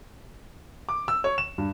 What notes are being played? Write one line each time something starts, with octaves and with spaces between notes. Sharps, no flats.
D6
E6
C#5
E7
G2